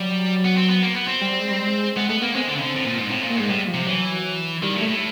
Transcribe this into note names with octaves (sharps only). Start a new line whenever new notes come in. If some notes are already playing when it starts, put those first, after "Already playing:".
Already playing: F#3 G3
B3
C4
B3
A#3
B3
C4
G3
G#3
G3
G#3
G#3 B3
A3 B3
A#3 B3
G#3 C4
D3
C#3
D3
A2
A#2
G#2
A2 C4
A#2
A#3
G#2 G#3
A2 G3
F3
C3
E3 F#3
D#3 G3
A2
A3
A2